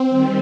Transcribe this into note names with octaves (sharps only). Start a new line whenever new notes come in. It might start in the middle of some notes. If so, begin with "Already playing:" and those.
Already playing: C4
D#3 G3